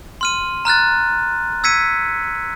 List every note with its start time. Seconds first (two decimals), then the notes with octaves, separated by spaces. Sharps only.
0.21 C6 F6 D#7
0.65 A#5 F6 F#6 A6
1.64 E6 G#6 B6 C#7 D#7